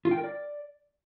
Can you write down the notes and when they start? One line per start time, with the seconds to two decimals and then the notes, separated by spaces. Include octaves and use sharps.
0.05 F4
0.11 G5
0.17 A#4
0.24 D5